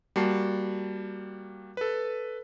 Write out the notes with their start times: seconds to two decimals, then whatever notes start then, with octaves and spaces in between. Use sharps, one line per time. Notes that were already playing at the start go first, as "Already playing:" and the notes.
0.16 G3 A#3 F#4 A5 C7
1.77 A4 B4